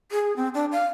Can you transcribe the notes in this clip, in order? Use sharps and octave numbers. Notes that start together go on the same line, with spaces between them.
G#4
C4
D4
F5